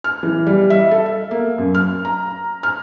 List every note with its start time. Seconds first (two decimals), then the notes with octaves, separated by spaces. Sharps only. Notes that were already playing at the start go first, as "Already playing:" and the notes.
0.04 F6
0.23 E3
0.47 G3
0.70 E5
0.91 A4
1.06 E5
1.31 A#3
1.58 F#2
1.75 F6
2.05 A#5
2.63 F6